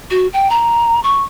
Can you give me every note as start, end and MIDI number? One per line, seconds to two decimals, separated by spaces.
0.10 0.27 66
0.33 0.50 79
0.50 1.02 82
1.03 1.23 85